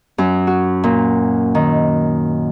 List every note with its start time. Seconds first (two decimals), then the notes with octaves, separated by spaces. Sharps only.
0.18 F#2
0.47 F#4
0.84 A#2
1.55 D#3